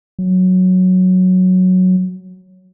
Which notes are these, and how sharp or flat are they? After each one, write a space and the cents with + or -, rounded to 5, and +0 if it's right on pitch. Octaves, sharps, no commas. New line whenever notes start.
F#3 -5